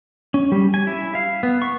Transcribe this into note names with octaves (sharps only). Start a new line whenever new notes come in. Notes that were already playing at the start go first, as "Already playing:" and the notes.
C#4
G3
G#5
E4
F5
B3
C#6